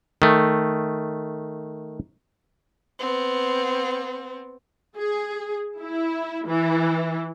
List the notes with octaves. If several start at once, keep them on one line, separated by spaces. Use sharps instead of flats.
D#3 A3
B3 C4
G#4
E4
E3